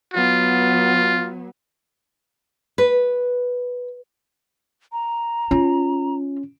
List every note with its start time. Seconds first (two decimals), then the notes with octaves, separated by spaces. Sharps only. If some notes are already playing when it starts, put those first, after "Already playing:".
0.14 F#3 B3 F4
2.78 B4
4.92 A#5
5.51 C#4 F4